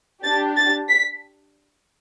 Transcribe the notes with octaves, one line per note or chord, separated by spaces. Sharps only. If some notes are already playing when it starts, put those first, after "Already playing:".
D4 G4 A6
A6
B6